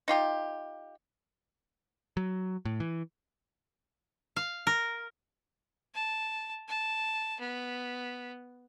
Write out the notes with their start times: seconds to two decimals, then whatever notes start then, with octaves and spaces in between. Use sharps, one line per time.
0.08 D#4 F4 G4
2.17 F#3
2.65 A2
2.80 E3
4.36 F5
4.67 A#4
5.94 A5
6.68 A5
7.40 B3